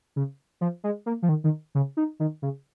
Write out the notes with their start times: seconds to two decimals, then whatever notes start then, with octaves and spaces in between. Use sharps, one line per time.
0.16 C#3
0.61 F3
0.84 G#3
1.06 A#3
1.22 F3
1.29 D#3
1.44 D#3
1.75 C#3
1.97 D#4
2.20 D#3
2.42 C#3